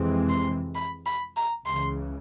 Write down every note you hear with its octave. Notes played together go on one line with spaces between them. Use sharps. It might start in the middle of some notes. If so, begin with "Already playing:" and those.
Already playing: F2 C3 E3 G#3 C4
C6
B5
B5
A#5
C#2 C#3 E3 C6